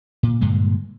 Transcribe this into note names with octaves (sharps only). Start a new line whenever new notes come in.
A#2
G2 A#2 D3 G#3